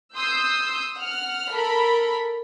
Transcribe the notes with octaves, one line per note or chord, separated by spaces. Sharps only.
C6 D#6 E6 G6
F#5 F6
A4 A#4 B5